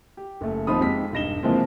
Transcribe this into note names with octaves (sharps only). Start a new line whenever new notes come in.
G4
F#1 A3
D#2 F3 C4 D#4 B5 D#6
F2 G#3 G4 B6
E1 G2 D#4 A#6 E7 G7
C3 E3 F3 G#3 A#3 C4